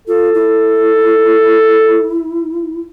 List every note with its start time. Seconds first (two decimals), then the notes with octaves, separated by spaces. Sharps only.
0.08 F4 A4
0.34 E4